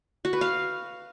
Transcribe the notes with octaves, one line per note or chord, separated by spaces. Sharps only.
F#4
B4
F5